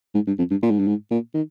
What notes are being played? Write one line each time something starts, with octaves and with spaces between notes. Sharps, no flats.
G#2
G2
F2
G2
A#2
G#2
G2
G#2
A#2
D#3